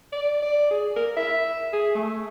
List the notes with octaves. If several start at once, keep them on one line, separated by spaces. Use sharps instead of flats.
D5
D5
G#4
A#4
E5
G#4
A3